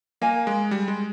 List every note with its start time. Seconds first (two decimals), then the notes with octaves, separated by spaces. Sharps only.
0.22 A#3 A#4 F5 G#5
0.47 G#3
0.71 G3
0.88 G#3